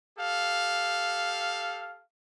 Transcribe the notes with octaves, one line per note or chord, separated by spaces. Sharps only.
G4 A4 F5